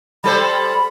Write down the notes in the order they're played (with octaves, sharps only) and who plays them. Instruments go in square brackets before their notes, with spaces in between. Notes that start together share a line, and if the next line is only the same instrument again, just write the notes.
[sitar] G3 A4 C5 [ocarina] B5